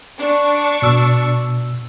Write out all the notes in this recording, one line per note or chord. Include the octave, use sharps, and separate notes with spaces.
D4 D5 C#6
B2 E6